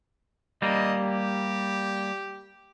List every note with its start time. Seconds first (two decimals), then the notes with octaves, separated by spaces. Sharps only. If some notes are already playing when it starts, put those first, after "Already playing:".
0.62 G3 A#3 D#5
1.01 G4